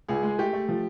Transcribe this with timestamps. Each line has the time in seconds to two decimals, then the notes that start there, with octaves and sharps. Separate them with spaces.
0.08 C#2 G#4
0.23 G#3
0.39 A3 G4
0.53 A3
0.69 F3